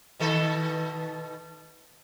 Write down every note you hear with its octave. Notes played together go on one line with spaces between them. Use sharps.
B2 D#3 A4